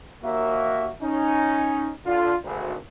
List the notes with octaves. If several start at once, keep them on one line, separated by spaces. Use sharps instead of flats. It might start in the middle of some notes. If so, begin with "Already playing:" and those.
D#2 A#3 F#4 E5
C#4 D#4
D3 F4
G#1 D2